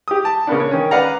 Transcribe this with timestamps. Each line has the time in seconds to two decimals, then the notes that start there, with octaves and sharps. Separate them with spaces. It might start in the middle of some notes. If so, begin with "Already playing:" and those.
0.08 G4 D#6
0.25 A5
0.47 C#3 A#3 B3 D4
0.60 C#5
0.71 D#3 C#4
0.91 B4 D5 F5 F#5 A#5